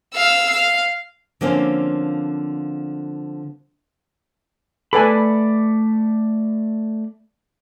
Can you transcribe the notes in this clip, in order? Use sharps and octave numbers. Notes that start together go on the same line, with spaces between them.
F5 E6
F5
D3 F3 A#3 C4 C#4
A3 A4 B4 D5 G#5 B5